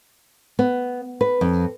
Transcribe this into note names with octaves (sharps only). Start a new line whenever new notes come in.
B3
B4
F2